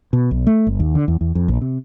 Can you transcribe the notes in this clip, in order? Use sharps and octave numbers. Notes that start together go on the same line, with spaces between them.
B2
B1
A3
G1
D#2
D3
E2
E2
F2
A#1
C3